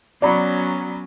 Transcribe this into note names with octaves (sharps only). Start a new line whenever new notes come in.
F#3 B3 C#4 D5 A#5 B5